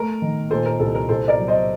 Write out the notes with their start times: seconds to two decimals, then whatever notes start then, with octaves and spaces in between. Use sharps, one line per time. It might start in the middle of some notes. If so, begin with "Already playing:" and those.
Already playing: A3 A#4
0.22 D#3
0.50 A#2 A4 C5
0.66 A#4
0.80 C2 A4
0.95 A#4
1.09 C2 A4 C5
1.28 A#4 D5
1.38 F#3
1.48 C5 D#5